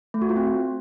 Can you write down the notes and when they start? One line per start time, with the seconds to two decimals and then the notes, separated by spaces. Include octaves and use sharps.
0.14 A3
0.22 F#4
0.29 F4
0.37 C4